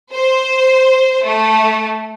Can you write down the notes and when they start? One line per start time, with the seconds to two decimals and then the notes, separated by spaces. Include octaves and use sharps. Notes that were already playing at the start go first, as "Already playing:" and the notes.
0.13 C5
1.24 A3